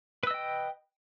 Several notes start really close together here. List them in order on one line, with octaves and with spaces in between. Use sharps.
B4 E6 D#5 G5